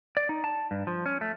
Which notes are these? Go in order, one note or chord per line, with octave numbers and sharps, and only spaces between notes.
D5
D#4
A5
G2
F3
C#4
A3